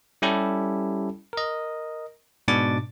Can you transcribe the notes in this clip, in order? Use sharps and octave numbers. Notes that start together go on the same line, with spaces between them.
G3 C#4 E4 G4 A4
A#4 D#5
G#2 B2 D4 D6 A6